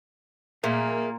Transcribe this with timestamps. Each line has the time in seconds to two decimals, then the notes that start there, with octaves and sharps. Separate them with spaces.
0.64 A#2 A#3 G#4 A#4 E5